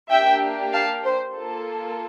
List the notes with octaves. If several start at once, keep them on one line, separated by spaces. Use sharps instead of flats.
A#3 D4 G4 E5 G5
F5 A5
C5
A#3 F4 A4